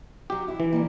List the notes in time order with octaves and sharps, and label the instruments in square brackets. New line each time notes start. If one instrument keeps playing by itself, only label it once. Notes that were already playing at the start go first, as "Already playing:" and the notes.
[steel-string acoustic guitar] F#3 F#4 [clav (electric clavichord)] G4
[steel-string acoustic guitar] E4
[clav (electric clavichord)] E3
[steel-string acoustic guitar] F3 G3 A#3